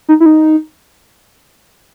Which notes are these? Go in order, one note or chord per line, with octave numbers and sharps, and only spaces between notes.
D#4
E4
D#4